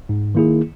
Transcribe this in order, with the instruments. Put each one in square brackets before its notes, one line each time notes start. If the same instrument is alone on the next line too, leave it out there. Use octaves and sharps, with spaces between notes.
[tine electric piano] G#2
D#3 A#3 E4 G#4